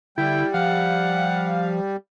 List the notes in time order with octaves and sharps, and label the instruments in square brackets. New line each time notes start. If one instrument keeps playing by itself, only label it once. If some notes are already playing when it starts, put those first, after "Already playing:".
[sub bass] D3 [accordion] G3 [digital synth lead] E4 [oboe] G5
[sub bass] F3 [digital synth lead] F5 [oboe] F#5